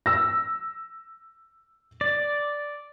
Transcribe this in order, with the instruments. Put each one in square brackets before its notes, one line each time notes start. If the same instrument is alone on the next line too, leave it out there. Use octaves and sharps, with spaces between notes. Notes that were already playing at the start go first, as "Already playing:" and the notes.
[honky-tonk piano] E6 A#6
[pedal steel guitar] D5